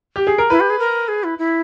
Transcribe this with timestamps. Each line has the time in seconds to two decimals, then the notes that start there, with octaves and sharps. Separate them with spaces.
0.16 G4
0.27 G#4
0.38 A#4
0.50 E4 B4
0.60 G4
0.70 G#4
0.79 A#4
1.08 G#4
1.24 E4
1.38 E4